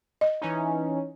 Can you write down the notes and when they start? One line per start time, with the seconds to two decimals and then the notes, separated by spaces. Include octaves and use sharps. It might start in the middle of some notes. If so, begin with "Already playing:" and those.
0.21 D#5
0.42 E3 C#4 D#4